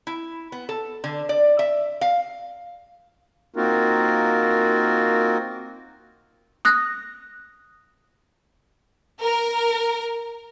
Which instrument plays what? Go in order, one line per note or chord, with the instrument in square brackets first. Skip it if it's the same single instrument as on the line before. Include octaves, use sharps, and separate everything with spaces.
[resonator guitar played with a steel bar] E4
B3
A4
D3
D5
E5
F5
[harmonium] A#3 C4 D#4 F4 F#4 A#4
[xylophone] D#6 F#6 A#6
[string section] A#4